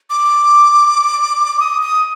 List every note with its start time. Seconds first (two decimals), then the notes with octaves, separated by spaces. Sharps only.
0.10 D6
1.60 D#6
1.82 D#6